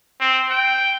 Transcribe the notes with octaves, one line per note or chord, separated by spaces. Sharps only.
C4
G5